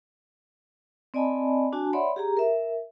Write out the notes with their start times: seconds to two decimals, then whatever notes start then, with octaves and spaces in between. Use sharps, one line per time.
1.14 C4 D5 D#5 G#5 A5 B5
1.72 D4 F#4 G#5 A5
1.93 C#5 D5 E5 F#5 B5 C6
2.16 G4 G#4 A#5
2.37 A#4 E5